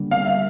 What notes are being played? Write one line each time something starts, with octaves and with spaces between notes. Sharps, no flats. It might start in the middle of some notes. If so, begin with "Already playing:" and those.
Already playing: D3 G3 A#3 D4
F5
E5